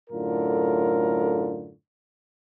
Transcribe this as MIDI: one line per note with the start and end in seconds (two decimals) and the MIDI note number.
0.10 1.73 42
0.10 1.73 45
0.10 1.73 50
0.10 1.73 65
0.10 1.73 70